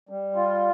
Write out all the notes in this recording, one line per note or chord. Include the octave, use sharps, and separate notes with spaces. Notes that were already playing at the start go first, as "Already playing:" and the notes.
G3
F4